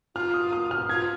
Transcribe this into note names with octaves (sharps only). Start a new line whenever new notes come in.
F4 F6
D#6
D#6
F6
F4 G#6